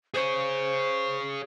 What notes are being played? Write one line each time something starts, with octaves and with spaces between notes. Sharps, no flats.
G#4 C5 C#5